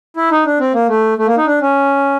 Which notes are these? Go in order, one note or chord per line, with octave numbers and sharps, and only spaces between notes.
E4
D#4
D4
C4
A#3
A3
A3
A#3
D#4
D4
C#4